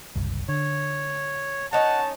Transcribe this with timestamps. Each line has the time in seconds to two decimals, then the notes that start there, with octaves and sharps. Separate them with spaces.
0.16 F#1 C2
0.49 D3 C#5
1.73 C#4 D#4 C#5 F#5 A5